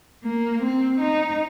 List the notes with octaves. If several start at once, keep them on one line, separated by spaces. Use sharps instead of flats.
A#3
C4
D#4